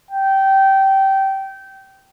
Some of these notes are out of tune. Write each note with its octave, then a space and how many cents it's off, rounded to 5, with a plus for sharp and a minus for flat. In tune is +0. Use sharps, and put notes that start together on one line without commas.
G5 -20